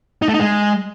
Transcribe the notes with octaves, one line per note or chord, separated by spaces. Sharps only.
D#4
A3
D#4
G#3